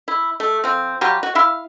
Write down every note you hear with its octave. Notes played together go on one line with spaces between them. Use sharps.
E4
A3
F3 C4
F#3 G3 F4 G4
F#4
E4 E5 F5